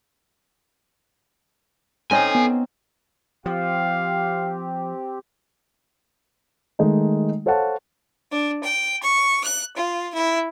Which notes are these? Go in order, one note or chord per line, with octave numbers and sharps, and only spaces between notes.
C4 C#4 D#4 A4 G#5
B3
F3 C4 G4 F5
D#3 G#3 A3 D#4
A4 C5 C#5 F5 F#5 A5
D4
G5
C#6
F#6
F4
E4